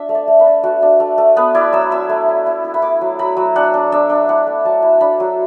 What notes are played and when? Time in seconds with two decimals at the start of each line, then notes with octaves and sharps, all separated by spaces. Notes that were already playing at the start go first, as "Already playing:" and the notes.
Already playing: D4 E5
0.09 A3
0.15 D5
0.28 A3
0.40 B4
0.46 D4
0.64 A3 F#4
0.82 D4
1.00 A3
1.18 A3
1.36 B3 B4
1.55 E4 D5
1.73 F#3 E6
1.91 E4 E6
2.09 A3
2.28 E4
2.46 E4
2.64 E4
2.74 B5
2.82 E4 D6
3.01 F#3
3.19 F#3 B5
3.37 F#3
3.56 D4 F#5
3.74 D4
3.92 D4 E5
4.10 D4
4.29 E4 F#5
4.47 A3
4.65 F#3 A5
4.82 E4
5.01 D4 B5
5.20 F#3